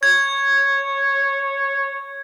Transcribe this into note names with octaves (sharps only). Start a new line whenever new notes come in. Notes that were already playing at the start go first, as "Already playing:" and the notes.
C#5 G#6